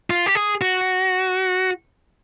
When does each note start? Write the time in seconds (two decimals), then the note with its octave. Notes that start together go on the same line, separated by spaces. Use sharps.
0.10 F4
0.26 G4
0.35 G#4
0.61 F#4